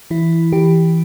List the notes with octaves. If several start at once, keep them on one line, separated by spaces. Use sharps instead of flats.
E3 E4
E3 G4